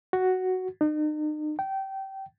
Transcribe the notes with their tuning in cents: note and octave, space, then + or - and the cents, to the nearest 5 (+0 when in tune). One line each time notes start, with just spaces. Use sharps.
F#4 +5
D#4 -40
G5 -20